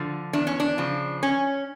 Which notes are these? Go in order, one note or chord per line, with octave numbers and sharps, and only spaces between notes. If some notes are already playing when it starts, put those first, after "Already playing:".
Already playing: D3 F3
E2 D4
C#4
D4
C#3 F3
C#4